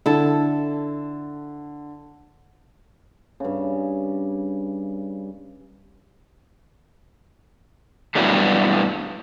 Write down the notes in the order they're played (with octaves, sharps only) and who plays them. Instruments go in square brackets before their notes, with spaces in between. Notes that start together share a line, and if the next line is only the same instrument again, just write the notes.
[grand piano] D3 [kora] E4 A4
[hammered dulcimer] G2 C#3
[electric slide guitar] G2 B2 E3 F#3 G3 A3